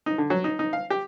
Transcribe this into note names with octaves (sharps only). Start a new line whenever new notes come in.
D#4
D3
F#3
D#4
D#4
F5
G4